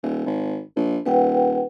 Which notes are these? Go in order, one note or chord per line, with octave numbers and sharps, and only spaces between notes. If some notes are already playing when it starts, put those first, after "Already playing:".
D#1
G#1
A#1
D#1 B4 F#5 G5